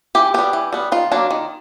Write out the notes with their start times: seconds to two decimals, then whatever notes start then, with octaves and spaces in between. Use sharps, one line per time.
0.15 E3 G4
0.34 G3 B3 G4
0.53 E3
0.73 G3 B3
0.92 D#3 F4
1.12 F#3 A#3 D4
1.31 D#3